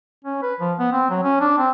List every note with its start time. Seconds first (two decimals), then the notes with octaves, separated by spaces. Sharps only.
0.24 C#4
0.42 B4
0.60 F3
0.79 B3
0.92 C4
1.10 F#3
1.23 C#4
1.40 D4
1.58 C4